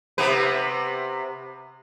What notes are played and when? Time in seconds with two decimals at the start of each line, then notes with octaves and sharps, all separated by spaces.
0.18 C3 B3 B4